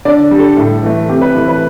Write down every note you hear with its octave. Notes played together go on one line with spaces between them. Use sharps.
D3 D5
G3
A4
A2
E3 A3
C3 G4
B4
E3 A3
B4